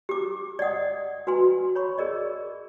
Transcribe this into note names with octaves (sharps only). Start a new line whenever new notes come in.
G4 D6
D5 D#5 F#5 D#6
F#4 B4 G#5 C6
C#5 B5 C#6
G#4 A#4 D5 D#5